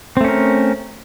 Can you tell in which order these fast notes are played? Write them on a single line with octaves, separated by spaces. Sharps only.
C4 A3 C#4 A#4